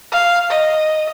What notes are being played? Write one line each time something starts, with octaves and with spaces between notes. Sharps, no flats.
F5
D#5